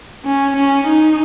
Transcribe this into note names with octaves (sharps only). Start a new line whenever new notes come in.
C#4
C#4
D#4